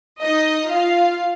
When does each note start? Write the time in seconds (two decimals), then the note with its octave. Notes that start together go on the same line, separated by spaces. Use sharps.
0.21 D#4 D#5
0.72 F4 F5